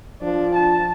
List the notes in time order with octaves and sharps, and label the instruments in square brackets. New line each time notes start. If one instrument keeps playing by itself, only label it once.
[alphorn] F3 [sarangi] D4
[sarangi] A5